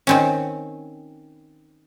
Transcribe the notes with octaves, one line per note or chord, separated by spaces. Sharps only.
D#3 C4 C#4